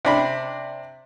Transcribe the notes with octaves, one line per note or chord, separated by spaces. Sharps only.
C3 D4 B5